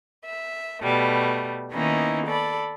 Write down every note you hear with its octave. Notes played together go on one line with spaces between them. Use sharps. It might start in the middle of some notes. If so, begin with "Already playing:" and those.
E5
B2 G3 A3
D#3 A#3 B3 C#4 D#4 E4
A4 D5 B5